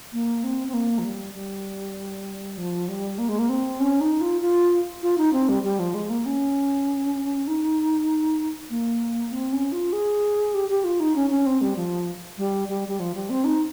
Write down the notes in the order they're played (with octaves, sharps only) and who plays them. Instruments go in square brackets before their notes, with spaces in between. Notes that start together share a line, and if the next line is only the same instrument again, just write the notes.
[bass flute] A#3
C4
C4
A#3
F3
G3
G3
F3
G3
A#3
G#3
A#3
C4
C#4
D#4
F4
F4
F4
D#4
C4
G3
G3
F3
G#3
A#3
C#4
D#4
A#3
C4
C#4
F4
G#4
G4
G4
F4
D#4
C#4
C#4
C4
G3
F3
G3
G3
G3
F3
G3
C4
D#4